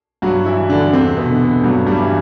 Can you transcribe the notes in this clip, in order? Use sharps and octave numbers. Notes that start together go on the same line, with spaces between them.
G2 F#3 F#4
E3 E4
E3
D3 D4
E2 C3 C4
B2 B3
D3
G2 F#3
G2 G3
E3